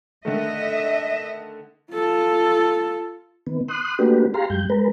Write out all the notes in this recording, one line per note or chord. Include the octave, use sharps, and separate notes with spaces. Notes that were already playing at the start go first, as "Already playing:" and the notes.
D3 D#3 A3 D#5 E5
F4 A4
D#3 B3
C6 D#6 F#6
A3 A#3 D4 F#4 G4 B4
G4 G#4 F5 A#5 C6
F#2 G3 G6
G#3 A#4 B4